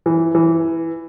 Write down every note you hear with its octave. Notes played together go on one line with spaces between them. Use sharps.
E3
E3